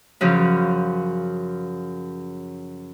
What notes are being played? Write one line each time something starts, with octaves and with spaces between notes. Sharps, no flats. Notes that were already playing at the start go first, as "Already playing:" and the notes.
F#2 C#3 F3